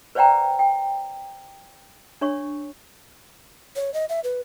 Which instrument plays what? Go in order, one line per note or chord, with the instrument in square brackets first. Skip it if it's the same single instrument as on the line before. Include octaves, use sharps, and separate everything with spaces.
[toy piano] B4 C5 D5 F#5 G5 A#5
G5
D4 C#5 C#6
[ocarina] C#5
D#5
E5
B4